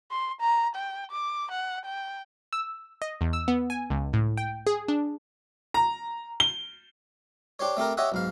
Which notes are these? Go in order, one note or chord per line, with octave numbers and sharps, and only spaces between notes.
C6
A#5
G5
D6
F#5
G5
E6
D#5
E2
E6
B3
G#5
C#2
A2
G5
G#4
D4
A#5
G7
D4 G4 C5 C#5
A3 C4 G4 A#4
G4 C#5 D#5 E5 F#5
B1 G#2 F5